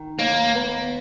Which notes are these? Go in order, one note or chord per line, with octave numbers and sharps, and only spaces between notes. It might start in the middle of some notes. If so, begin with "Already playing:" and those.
Already playing: D#3
D#2 A#3
B3